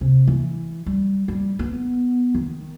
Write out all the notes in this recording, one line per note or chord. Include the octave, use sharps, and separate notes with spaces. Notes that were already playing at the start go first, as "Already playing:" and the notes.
C3
E3
G3
G3
B3
D#3